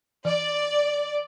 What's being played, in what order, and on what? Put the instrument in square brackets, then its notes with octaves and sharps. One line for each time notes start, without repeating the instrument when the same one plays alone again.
[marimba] E3 [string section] D5